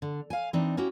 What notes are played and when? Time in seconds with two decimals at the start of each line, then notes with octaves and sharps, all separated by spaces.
0.02 D3
0.30 F5 G#5
0.53 E3 C4 D4 D#4
0.77 C#4 E4 F#4 G4